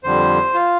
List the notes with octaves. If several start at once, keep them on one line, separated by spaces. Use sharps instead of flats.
F2 D3 G3 C5
F4